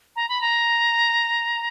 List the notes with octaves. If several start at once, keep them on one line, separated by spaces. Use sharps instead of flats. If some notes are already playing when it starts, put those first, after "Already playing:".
A#5
B5
A#5